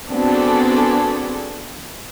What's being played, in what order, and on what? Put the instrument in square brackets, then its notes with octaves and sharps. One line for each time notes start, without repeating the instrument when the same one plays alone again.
[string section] B3 C4 D4 F#4 G#4 A4